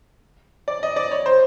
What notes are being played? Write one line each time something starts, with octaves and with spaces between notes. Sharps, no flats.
D5
D#5
D5
C#5
C5